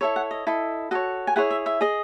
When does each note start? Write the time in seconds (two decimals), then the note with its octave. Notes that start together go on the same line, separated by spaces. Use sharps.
0.01 E4 A4 C#5 E5
0.16 F#5
0.31 D#5
0.47 E4 A4 D#5
0.91 F#4 A4 C#5 D#5
1.27 G#5
1.36 E4 G#4 C#5 F#5
1.51 E5
1.66 E5
1.81 G#4 D#5